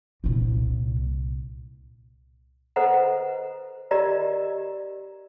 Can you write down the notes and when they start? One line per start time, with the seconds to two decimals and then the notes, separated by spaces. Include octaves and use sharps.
0.24 C2 A#2
2.76 A4 B4 C5 D#5 F#5 A#5
3.91 G4 A#4 D5 D#5 A#5